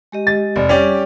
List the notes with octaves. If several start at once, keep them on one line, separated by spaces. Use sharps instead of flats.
G#3 G4 D#5
A6
F1 D5
G3 C#4 G4 D5